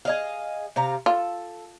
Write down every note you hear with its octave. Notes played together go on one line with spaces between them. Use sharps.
G#4 D#5 F5
C3 F5 A#5
F4 A4